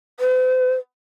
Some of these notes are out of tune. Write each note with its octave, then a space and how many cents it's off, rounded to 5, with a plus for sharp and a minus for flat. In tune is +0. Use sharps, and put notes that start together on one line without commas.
C5 -45